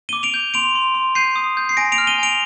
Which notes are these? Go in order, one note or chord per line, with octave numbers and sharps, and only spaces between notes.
D6 D#7 G7
D7 F7
G6
C6 D7 F7
C6
C6
G6 C7 D#7
D#6
G6
C7
G#5 A#6 D7
D7 F7
F6
D#7 G7
G#5 D7 F7